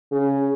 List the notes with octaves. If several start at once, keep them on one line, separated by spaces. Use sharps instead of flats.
C#3